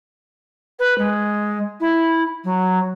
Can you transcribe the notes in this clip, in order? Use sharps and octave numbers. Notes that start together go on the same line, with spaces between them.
B4
G#3
E4
F#3